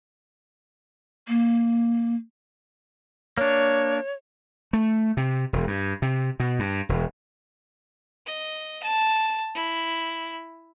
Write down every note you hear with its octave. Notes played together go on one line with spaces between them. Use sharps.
A#3
A#3 D4 C#5
A3
C3
E1
G2
C3
B2
G2
E1
D#5
A5
E4